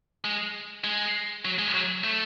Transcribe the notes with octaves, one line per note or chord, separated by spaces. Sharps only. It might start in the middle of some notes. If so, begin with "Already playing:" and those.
G#3
G#3
F#3
G#3
F#3
A3